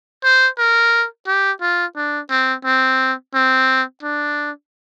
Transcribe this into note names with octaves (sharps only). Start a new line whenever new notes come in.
C5
A#4
G4
F4
D4
C4
C4
C4
D4